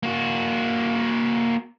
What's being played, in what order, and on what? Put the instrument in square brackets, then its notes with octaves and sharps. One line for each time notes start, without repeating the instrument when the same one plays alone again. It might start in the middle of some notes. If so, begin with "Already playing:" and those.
[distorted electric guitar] A#3 F#4